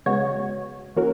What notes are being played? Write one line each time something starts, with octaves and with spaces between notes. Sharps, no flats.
C#3 G#3 B3 F#4 C#5
E3 A#3 C#4 F#4 A#4